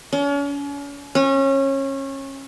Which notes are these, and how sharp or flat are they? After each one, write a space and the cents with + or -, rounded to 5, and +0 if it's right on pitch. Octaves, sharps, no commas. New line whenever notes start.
C#4 +40
C#4 -25